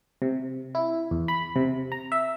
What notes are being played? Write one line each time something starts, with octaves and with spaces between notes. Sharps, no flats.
C3
E4
E2
B5
C3
A#5
E5